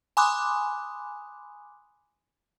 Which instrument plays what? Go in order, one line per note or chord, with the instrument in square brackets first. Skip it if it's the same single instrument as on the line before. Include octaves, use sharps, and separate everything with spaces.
[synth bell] G#5 B5 C6 D6 D#6 F#6